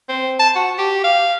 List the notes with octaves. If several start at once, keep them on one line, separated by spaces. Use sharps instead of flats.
C4
A5
F#4
G4
F5